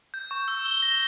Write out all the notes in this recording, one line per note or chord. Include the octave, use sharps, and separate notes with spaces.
G6
C#6
E6
G7
A#6